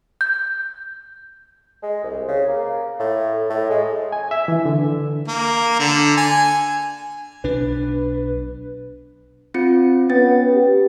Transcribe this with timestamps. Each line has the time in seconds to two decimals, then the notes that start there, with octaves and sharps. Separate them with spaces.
0.21 G6
1.83 G#3
2.03 C2
2.28 C#3
2.48 A#3
2.99 A2
3.50 A2
3.70 G#3
4.12 G#5
4.31 E5
4.48 E3
4.65 D3
5.28 A#3
5.79 D3
6.17 G#5
7.44 B1 D4 B4
9.54 C4 F4 C#7
10.10 B3 C#4 A6
10.53 G4